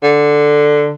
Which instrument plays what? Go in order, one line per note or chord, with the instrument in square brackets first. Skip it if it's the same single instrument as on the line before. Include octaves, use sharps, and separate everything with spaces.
[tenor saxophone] D3